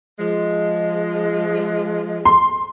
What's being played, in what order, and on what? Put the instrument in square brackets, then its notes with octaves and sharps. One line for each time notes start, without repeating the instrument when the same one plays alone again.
[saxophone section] F3 G#3
[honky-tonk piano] C6